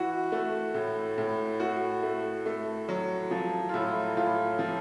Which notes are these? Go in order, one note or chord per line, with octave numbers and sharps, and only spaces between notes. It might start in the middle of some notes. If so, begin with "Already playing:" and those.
Already playing: E3 F#4
A3
A2
A2
A3 F#4
A3
A3
F#3
F3
F4
A2 E4
A2 F4
F3